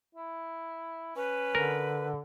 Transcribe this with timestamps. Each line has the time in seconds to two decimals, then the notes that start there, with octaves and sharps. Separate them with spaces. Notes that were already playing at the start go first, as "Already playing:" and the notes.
0.15 E4
1.16 C#4 B4
1.55 D3 A#4